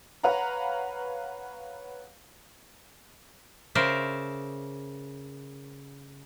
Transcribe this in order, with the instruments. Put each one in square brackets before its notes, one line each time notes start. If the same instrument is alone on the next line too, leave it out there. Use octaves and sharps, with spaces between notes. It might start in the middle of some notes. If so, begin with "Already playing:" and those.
[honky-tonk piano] B4 C#5 F5 F#5 A#5
[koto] C#3 A#4 C5 D5 E5